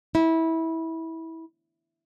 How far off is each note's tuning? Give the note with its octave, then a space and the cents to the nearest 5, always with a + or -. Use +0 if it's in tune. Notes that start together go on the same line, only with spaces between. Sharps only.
E4 -20